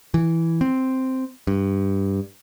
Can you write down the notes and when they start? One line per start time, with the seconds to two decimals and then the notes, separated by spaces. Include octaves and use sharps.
0.14 E3
0.61 C4
1.47 G2